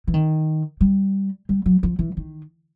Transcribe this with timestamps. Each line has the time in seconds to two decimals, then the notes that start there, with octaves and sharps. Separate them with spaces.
0.07 E3
0.14 D#3
0.81 G3
1.49 G3
1.66 F#3
1.83 F3
1.99 E3
2.17 D#3